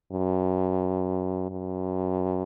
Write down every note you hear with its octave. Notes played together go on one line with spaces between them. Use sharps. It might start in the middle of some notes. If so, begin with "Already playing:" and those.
F#2
F#2